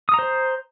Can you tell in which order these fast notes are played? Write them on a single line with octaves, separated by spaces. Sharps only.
D#6 A#5 C5